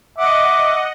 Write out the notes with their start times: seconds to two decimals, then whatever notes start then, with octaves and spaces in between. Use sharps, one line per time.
0.18 D#5 E5 F#5 D6